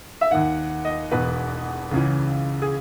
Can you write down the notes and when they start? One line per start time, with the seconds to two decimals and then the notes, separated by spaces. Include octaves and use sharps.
0.21 E5
0.31 D#2 D#3 F#5
0.85 D#5
1.11 E1 E2 B2 B4
1.91 C#2 C#3 E3
2.62 G#4